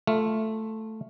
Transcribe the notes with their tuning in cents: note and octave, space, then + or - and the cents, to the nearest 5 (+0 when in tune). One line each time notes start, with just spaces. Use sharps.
A3 +0 F4 +0